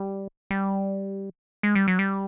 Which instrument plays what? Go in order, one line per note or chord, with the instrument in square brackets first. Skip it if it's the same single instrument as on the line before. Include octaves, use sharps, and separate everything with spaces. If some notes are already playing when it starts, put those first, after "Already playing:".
Already playing: [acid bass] G3
G3
G#3
G3
F#3
G3